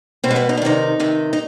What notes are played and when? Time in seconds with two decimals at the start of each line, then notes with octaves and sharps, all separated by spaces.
0.24 B2 C4
0.31 G#3
0.36 B3
0.49 D#4
0.57 D4
0.62 C3 D#3 D#4
1.00 C3 D#3
1.33 D#4